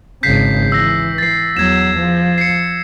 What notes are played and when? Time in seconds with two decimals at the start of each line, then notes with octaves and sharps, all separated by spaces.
0.23 G#1 C#3 G6 B6 C7
0.72 E3 E6 A#6
1.18 A6 C7
1.57 E2 F#3 G#6 E7
1.98 F3
2.38 C7 C#7